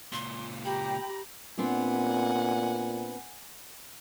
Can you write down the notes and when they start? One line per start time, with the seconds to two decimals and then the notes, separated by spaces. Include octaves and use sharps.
0.13 C#2 A#2 C6
0.65 G4 G5 A#5 B5
1.58 A#2 B3 C4 D4 F#5 G#5